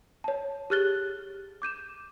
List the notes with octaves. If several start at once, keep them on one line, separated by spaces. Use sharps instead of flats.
C#5 A5
G4 G#4 F6 F#6 A6 G7
D6 G6 D#7 E7